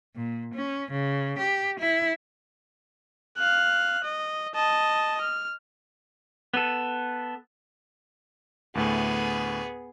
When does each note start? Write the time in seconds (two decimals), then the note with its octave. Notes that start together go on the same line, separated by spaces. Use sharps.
0.16 A#2
0.54 C#4
0.92 C#3
1.39 G4
1.80 E4
3.38 F5 F#6
4.05 D#5
4.55 D#5 A5
5.21 F6
6.54 B3 A4
8.75 D2 A2 A3 B3 G#4